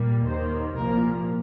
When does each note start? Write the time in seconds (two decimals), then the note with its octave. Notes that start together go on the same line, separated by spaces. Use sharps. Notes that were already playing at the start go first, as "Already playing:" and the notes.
Already playing: A#2 G3 A#3
0.26 D#2 D#3 A#3 C5
0.76 C2 A#2 F3 A#3 A#4